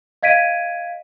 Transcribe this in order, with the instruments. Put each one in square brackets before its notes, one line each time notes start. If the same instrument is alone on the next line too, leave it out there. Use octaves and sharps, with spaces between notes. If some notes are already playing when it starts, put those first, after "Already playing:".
[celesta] D#5 F5 G#6 B6 D7 D#7